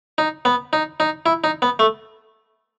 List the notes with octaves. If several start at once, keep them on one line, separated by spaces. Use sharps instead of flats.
D#4
B3
D#4
D#4
E4
D#4
B3
A3